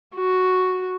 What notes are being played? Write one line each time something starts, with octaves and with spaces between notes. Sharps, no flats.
F#4